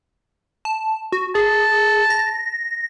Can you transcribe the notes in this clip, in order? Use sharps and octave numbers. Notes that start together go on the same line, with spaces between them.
A5
F#4
G#4 A5
A#6